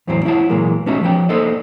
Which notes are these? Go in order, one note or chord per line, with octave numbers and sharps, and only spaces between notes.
E2 A2 E3 F#3 C4
E4 C#5 F#5 G5 A5
A#2 E3 F#3 G#3 A#3
A3 B3 C#4 D#4 F#4 E5
F3 C#5 G5
A#3 D#4 A4 C5 D5 D#5